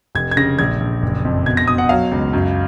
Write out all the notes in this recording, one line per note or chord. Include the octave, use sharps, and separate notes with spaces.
F1 G#6
G#6
C#3 A#6
A#1 G#6
A#1
F#1
F2
B2 G#6
A#6
B2 D#6
F#5
F#3 F5
C#2
F#2